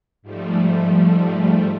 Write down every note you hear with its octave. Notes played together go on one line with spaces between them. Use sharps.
G#2 F3 G3 A3